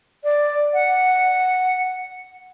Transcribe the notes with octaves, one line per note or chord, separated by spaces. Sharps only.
D5
F#5